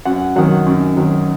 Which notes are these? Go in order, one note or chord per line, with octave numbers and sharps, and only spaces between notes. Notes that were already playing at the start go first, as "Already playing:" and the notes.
F#2 F#5
D#3 F#3 F#5
F#2
D#3 F#3